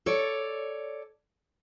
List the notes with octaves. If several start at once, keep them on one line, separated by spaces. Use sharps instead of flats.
A4 C#5 D5